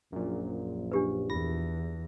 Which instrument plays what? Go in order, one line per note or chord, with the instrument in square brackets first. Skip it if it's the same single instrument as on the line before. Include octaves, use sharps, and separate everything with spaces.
[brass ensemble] A#1 [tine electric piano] F#2 A#2
[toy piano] D4 G4 B4
[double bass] E2 [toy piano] F4 [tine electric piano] A#6